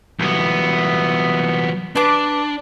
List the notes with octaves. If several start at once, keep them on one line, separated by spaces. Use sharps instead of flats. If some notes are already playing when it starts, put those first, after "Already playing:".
C2 E3 F#3 B3 E5 D#6
D4 B4 A5 D6